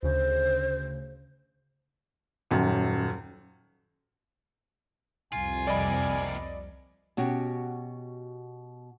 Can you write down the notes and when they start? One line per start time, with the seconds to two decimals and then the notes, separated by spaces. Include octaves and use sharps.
0.03 D2 C#3 C5
2.51 D#1 F#2
5.32 C2 F2 F4 G#5
5.67 C3 A#3 D5 D#5 B5
7.17 B2 C#4 F#4 G4